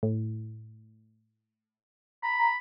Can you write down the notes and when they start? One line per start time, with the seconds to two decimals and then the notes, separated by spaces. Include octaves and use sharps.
0.03 A2
2.23 A#5 B5